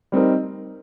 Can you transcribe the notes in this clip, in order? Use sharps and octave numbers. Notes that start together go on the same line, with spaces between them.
G3 C4 D#4 A#4